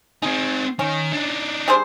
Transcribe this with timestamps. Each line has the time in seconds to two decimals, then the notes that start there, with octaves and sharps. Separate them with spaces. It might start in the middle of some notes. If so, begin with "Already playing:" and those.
0.22 C4 D#4 G#4
0.79 D#3 C#4
1.13 D4 D#4
1.68 G3 G#4 C5